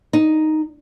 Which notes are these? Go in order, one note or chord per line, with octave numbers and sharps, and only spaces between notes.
D#4